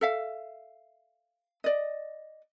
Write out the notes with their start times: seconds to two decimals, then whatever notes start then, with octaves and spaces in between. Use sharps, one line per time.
0.01 A4 E5 F5
1.64 D5 D#5